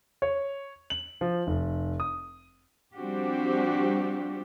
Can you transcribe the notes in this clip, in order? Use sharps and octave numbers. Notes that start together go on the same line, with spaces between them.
C#5
F#7
F3
F1
D#6
F3 G3 C4 D4 F#4 G4